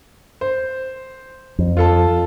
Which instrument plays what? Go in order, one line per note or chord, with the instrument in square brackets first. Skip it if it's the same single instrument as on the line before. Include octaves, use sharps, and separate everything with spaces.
[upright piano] C5
[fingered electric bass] F2
[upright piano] F4 A4 A5